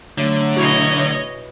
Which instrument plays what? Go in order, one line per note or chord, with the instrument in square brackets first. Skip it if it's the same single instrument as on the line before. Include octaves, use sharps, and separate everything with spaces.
[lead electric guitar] D3 [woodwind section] F#3 A3
[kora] B2 E4 [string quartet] C#5 D#5